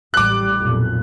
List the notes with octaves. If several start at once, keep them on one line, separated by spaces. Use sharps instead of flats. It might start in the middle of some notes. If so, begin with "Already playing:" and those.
A1 G3 D6 F#6
B1 F2 A#2